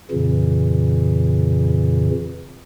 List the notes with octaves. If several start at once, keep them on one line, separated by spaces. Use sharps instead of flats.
F2 A#2 C#3 E3